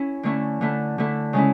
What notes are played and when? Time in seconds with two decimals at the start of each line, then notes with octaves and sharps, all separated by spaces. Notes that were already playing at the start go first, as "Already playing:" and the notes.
Already playing: C#4 E4
0.23 D3 A3 C#4 E4
0.61 D3 A3 E4
0.98 D3 A3 E4
1.33 C#3 G#3 C#4 E4